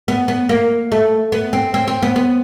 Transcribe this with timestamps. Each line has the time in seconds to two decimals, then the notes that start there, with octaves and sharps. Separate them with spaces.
0.08 B3
0.28 B3
0.49 A#3
0.92 A3
1.32 B3
1.53 C4
1.74 C4
1.88 C4
2.02 B3
2.16 B3